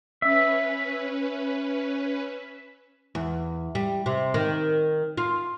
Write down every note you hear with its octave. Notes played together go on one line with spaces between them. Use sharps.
C#4 B4 E5
E2
G3
C3
D#3
F4